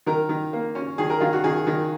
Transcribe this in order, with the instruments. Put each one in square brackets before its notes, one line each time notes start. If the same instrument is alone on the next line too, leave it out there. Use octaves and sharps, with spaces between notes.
[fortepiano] D#3 A#4
D#3
A#3
C#4
D#3 G#4
A#4
D#3 F4
F#4
D#3 G#4
D#3